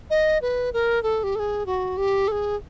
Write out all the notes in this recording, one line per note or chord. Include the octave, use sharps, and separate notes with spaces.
D#5
B4
A#4
A4
G4
A4
G#4
F#4
G4
A4
G#4